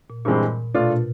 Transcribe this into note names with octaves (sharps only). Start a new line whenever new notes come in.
A#2
G2 A#2 E3 G#3 C4
B2 A3 D4 F4
A#2